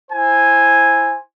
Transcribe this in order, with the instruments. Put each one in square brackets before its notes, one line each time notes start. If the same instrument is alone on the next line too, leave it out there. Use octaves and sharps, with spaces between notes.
[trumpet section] E4 C5 G#5